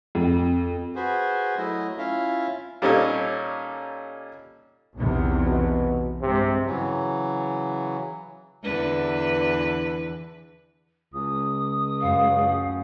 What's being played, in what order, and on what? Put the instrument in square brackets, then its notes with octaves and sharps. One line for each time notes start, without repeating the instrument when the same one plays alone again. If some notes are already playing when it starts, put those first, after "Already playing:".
[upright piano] F2
[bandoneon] F#4 G#4 B4 C5
F#3 A3 E4 D#5
C#4 E4 F4 E5 F5
[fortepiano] A#2 G3 C#4 D#4 A4 C#5
[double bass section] B1 E2 C3
[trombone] B2
[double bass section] G2 G#3 [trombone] C3
[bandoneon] C#3 E3 F#3
[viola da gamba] E2 D3 B4
[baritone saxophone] C#2 [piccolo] D#6
[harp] F#2 A3 [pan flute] F5